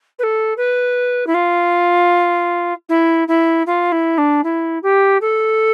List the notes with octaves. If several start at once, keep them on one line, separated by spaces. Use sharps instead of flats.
B4
A4
B4
E4
F4
E4
E4
F4
E4
D4
E4
G4
A4